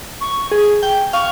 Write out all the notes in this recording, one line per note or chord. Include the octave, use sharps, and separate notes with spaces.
C#6
G#4
G5
F5 C#6